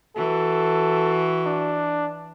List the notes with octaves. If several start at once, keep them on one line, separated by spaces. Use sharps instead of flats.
E3 F#4 A4
D4